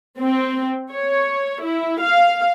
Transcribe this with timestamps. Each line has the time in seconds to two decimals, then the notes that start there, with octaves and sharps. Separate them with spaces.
0.19 C4
0.92 C#5
1.62 E4
2.01 F5